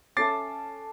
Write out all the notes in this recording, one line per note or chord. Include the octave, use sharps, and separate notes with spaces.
C#4 A4 E5 D6 A6 C7